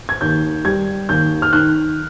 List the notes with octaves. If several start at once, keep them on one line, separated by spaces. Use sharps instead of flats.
G#6
D#2 G6
G3 G#6
D#2 G6
F6
D#3 F#6